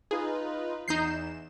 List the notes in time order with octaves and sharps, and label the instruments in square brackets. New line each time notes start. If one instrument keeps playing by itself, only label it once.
[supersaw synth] D#4 F4 B4 [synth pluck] G#4
[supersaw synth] E2 E7 [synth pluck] D#4 G6 C7